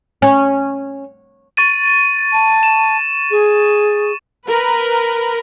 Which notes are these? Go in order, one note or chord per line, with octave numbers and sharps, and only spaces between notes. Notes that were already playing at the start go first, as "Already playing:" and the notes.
C#4
C#6 A6 D#7
A5
E7
G#4
A#4 B4